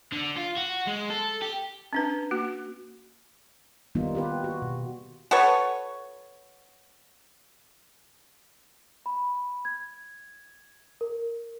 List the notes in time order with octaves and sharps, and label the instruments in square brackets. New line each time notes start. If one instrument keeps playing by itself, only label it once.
[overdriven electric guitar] D3
F4
F#4
G#3
A4
G4
[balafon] C#4 D4 B4
A#3 F#4
[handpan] D#3 G3 A#3 B3 D#4 F4
F4 G4 B4
F#4
B2
[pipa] F#4 A4 B4 C#5
[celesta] B5
G#6
A#4